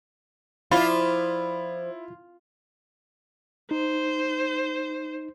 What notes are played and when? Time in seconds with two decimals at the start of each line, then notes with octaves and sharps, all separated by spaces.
0.71 F3 E4 F4 D5 E5 B5
3.71 D#4 C5